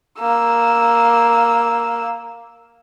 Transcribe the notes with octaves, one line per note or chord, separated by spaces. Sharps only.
A#3 E6